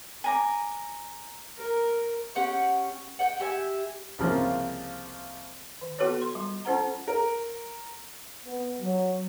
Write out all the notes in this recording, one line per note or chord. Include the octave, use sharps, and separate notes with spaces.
G#5 A#5 D6
A#4
C#4 G4 F#5 G5
F#5 G5
G4 E5 G5 G#5
C2 C#3 F3 A#3
D#3
B3 F4 F#4 A4 B4 C#5
C6
G3
C#4 F4 A4 C5 F#5 A#5
A#4
B3
F#3